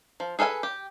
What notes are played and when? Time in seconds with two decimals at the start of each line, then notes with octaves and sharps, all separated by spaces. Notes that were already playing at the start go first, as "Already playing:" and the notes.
0.20 F3
0.39 G#4 A4 B4 E5 G#5
0.63 G4